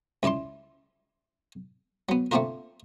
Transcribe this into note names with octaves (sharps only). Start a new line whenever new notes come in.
C#2 E4 D5 A5 C6
F#3 B3
A3 A#3 C4 D4 F4 A#4